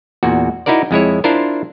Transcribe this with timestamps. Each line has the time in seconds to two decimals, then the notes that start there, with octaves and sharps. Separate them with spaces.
0.23 E2 A#2 F#4
0.66 D#4 E4 F#4 A#4 D5
0.91 F2 G#3 E4 C#5
1.24 D4 E4 F4 A#4 C5